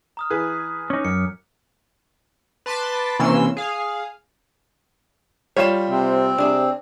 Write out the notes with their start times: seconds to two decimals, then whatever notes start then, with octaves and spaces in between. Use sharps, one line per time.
0.17 A#5 D#6 F6
0.30 E3 G#4 B4 F#6 G#6 B6
0.90 C#4 D#4 D6
1.05 F#2 F6 C#7
2.66 B4 A5 C6 D6 A6 B6
3.19 C3 E3 A#3 C#4 C6 E6
3.57 G#4 F5
5.56 G3 F4 C#5 F5 E7
5.90 C3 C4
6.38 C3 D4 G#4